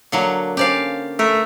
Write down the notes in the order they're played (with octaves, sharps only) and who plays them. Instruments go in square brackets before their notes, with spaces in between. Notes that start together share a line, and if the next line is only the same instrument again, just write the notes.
[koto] D3 F#3 A#3
[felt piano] C#4 C5 [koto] G4 D5 F5
[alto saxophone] A3 [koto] A#4